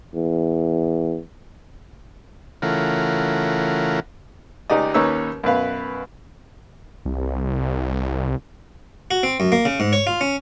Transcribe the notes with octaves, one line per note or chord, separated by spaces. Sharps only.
E2
C#3 E3 A3 F4 A#4 F#5
C#2 D#4 G4 D5 D#5
D#2 C#4 D#4 B4 C#5 E6
F#2 B2 B4 F5
C2
F#4
C4
F#2
A#3
C#3
G#2
C#5
F4
C#4